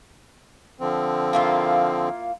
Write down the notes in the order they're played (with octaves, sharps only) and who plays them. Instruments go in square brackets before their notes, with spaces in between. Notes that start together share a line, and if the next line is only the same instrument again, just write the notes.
[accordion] D3 F3 C4
[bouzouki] A#3 E4 F4